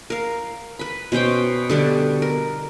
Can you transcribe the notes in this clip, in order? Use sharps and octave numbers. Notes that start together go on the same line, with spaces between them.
A#4 F5
B4 B5
B2 C#4 C5 G5
D3 G3 B3 D4
A#4